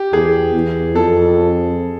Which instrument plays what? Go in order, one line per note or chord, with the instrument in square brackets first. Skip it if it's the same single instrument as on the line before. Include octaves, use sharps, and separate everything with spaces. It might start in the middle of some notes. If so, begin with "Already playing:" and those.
Already playing: [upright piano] G4
[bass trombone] E2 [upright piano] G#4
[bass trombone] E2
[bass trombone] F2 [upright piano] A4